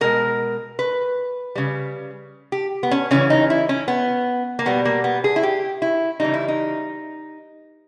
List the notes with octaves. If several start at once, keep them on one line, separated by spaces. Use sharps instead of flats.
B2 G#3 A#4
B4
C#3 G3
G4
B3
C#4
C#3 E3 G3 C#4
D#4
E4
C#4
B3
A#3
B2 G3 B3
A#3
B3
G#4
E4
G4
E4
C#3 E3 G3 D#4
E4
D#4